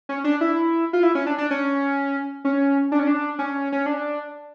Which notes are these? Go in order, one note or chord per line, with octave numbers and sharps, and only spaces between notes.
C#4
D4
E4
F4
E4
C#4
D4
D4
C#4
C#4
D4
C#4
D4
C#4
C#4
D4